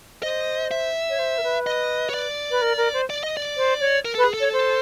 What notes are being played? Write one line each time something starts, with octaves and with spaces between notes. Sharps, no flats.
C5 D#5
E5
C#5
C5
A#4
B4
D#5
C#5
D5
B4
A#4
A#4
C5
D5
D#5
D5
C5
C#5
A#4
A4 B4
G#4
A4
C#5
C5